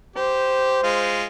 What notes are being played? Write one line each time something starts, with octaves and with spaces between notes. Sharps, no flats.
G4 C5
G#3 F4